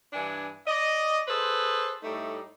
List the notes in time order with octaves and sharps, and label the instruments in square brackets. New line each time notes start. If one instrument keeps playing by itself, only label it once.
[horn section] G2 E3 D4 G#5
D5 D#5
G#4 A4 B4 C5
A2 G3 A3 D#4